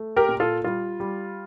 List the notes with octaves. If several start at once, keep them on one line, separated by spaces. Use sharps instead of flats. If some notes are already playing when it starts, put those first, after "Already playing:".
Already playing: A3
G4 A#4
A#2
F4 A4
G3 F4
G3